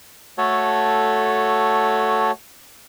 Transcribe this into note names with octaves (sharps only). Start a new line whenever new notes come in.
A3 F#4 A4 C#5